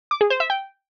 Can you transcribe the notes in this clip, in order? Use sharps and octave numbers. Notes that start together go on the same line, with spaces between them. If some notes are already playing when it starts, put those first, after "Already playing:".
D6
G#4
C5
E5
G5